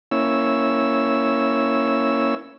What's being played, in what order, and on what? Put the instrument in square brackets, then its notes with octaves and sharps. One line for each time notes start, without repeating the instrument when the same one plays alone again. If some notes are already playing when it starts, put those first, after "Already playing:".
[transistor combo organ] A#3 C#4 E4 C#5 E6